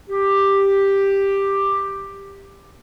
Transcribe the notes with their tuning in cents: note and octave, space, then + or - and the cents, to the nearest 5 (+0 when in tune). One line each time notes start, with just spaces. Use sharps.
G4 +5